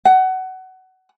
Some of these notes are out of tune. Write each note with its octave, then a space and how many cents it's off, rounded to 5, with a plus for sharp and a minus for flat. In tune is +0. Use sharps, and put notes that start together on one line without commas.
F#5 +20